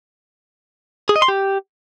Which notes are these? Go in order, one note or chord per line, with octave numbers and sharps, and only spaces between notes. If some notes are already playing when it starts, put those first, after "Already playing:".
G#4
D#5
C6
G4